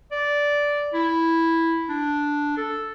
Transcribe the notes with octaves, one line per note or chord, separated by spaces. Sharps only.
D5
E4
D4
A4